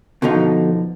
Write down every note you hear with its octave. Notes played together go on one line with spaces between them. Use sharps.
B2 D3 F3 D#4